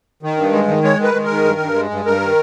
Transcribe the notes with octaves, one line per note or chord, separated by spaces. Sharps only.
D#3
G2
G#3
D#3
G#3 C#5
D#3
B4
G#3
A#4
D#3
G2
G2
G#3
G2
G2 A#4
D#3